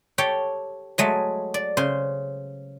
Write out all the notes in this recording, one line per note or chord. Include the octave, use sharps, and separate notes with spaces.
G4 A4 C#5 G5
F#3 G#3 A3
D5
C#3 C5 C6